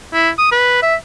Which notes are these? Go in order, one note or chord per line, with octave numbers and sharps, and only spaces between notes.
E4
D#6
B4
E5